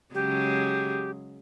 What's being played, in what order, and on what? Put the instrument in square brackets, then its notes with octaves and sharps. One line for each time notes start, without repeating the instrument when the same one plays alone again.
[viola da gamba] C#3 F#3 G#3 [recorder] G4